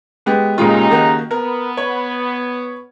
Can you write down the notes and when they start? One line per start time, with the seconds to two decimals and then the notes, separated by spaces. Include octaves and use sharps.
0.26 G#3 B3 G4
0.58 A#2 C#3 G#3 D#4 F4 G4
0.90 D#3 A#3 F#4
1.31 B3 A#4
1.77 C#5